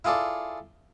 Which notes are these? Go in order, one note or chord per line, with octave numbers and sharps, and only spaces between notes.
E4 F4 G#4 A4 D5